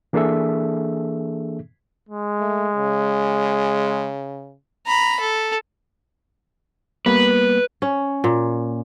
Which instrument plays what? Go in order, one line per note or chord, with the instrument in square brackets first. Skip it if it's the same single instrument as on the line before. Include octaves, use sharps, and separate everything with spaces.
[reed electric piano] E3 A#3 D4 G#4 A4 E5
[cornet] G#3
[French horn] A3
C#3
[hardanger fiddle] A#5 B5
A4
[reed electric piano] G3 A#3 B3 [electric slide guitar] B4
[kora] C#4
A#2